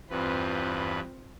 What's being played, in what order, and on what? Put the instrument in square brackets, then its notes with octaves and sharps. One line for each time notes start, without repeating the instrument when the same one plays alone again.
[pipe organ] E2 G2 B4 [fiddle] C4 F4